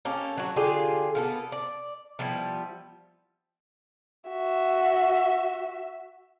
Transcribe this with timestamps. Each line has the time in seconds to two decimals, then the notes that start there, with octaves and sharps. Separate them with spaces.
0.05 A#3 C#4 G4 A4
0.37 F#3 F#4
0.56 D3 F4 G4 G#4
1.15 A#3 B3 A4
1.52 D5
2.19 F3 G3 B3 E4
4.30 F#4 E5